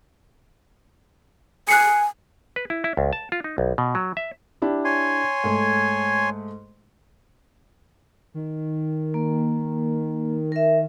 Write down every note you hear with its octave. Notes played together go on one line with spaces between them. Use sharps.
G#5 F#6 C7 C#7
B4
E4
E4
C#2
A5
F4
D#4
B1
B2
F#3
E5
D4 E4 G4
C#5 G#5 C6
G#2 A3
D#3
A#3
A#4 E5